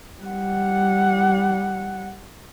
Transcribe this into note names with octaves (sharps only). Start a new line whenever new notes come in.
G3 F#5